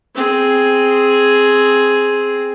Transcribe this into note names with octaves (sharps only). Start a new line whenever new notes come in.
C4 G#4